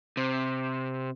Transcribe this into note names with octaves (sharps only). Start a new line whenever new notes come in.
C3